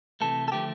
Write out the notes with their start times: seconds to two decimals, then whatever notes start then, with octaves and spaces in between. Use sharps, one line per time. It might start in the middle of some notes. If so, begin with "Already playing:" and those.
0.21 C3 E3 A3 A4
0.48 A4
0.52 D3 F3 A3 G4